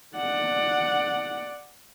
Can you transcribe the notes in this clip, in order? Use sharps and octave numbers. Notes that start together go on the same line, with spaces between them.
D5 F#5